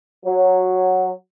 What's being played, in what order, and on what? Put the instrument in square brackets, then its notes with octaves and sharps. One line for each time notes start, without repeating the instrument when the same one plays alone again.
[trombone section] F#3